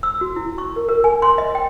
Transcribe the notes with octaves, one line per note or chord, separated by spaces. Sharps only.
E6
F#4
E4
C#6
A#4
A#4
G#5
C6
D#5
G5